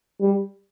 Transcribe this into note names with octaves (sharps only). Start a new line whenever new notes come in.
G3